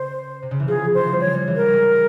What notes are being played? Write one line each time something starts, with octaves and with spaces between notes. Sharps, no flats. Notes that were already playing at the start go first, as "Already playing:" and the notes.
Already playing: C#3 C5
C3
C#3
E3
F3 G#4
E3 C5
F3
G3
G#3 C#5
G3
E3
G3 A#4
G#3